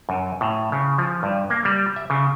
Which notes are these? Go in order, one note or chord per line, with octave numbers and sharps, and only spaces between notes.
F#2
A2
C#3
F3
G2
A#3
G3
E5
C#3